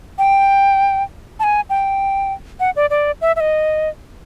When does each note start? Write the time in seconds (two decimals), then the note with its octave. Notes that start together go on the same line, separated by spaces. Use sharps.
0.18 G5
1.40 A5
1.43 G#5
1.70 G5
2.60 F#5
2.76 D5
2.90 D5
3.21 E5
3.36 E5
3.40 D#5